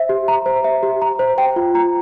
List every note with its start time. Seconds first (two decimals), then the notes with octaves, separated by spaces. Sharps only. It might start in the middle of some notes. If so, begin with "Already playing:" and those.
Already playing: C5 E5
0.09 G4
0.28 A#5
0.46 C5
0.64 E5
0.83 G4
1.02 A#5
1.19 C5
1.38 G5
1.56 F4
1.75 A#5